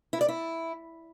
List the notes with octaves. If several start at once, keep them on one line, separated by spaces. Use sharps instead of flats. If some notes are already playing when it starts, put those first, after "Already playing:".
E4
D5
E4